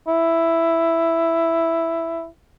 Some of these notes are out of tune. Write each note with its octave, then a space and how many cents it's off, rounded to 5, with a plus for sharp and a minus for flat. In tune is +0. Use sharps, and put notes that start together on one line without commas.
E4 +5